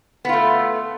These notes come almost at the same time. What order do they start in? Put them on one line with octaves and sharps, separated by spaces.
B3 F4 A3